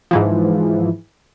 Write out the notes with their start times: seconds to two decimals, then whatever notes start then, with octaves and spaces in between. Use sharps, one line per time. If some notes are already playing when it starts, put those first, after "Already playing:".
0.11 G#2 E3 F3